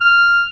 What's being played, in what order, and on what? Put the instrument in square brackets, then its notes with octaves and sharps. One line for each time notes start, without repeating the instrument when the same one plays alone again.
[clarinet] F6